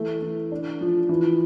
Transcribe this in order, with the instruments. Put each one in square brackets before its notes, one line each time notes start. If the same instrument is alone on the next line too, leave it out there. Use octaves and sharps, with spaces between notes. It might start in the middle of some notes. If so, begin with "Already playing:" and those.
Already playing: [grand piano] E3 A3
E3
D4
F3
E3